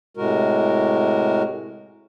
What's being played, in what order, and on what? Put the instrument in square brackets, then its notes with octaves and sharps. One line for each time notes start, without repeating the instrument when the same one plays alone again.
[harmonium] A2 C3 G#3 F#4 A#4